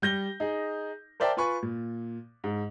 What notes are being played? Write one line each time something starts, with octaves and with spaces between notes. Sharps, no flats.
G3 G6 A#6 G7
D#4 G#4
A#4 C5 D5 E5 G5 A5
F4 B4 G#5 B5 C#6
A#2
G#2